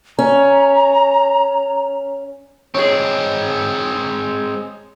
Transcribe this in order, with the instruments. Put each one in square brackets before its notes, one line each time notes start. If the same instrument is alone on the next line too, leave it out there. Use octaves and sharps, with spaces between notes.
[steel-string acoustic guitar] C#4 [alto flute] A#5
[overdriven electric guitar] G#3 C4 [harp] G#4 C#5